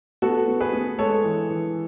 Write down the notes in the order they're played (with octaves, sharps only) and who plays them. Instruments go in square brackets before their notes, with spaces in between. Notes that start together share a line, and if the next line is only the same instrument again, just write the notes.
[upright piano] B3 F#4 A4
B3
G#4 B4
B3
G#3 A4 C#5
E3
E3